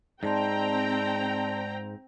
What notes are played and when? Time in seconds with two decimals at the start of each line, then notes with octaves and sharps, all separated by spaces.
0.23 G#2 C4 D5 G5 A5 A#5 C6